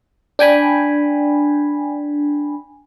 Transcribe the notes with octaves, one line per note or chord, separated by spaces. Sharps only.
D4 G5 G#5 B5